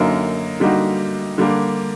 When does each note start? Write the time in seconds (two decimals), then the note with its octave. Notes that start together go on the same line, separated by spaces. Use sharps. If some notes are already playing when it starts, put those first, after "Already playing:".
Already playing: F#2 D3 F#3 A#3 D#4
0.60 D3 G3 A#3 D#4 F#4
1.38 D3 G3 A#3 D4